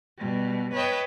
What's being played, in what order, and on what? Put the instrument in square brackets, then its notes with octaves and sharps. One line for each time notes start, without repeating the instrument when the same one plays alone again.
[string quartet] B2 G3
B4 C#5 D#5 G5 A5